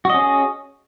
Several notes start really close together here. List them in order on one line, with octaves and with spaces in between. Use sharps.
F#4 D#5 C#4 G#4